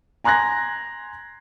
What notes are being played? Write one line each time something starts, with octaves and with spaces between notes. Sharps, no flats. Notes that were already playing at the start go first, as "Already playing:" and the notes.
G#5 A#5 C6 F#6 G#6 A#6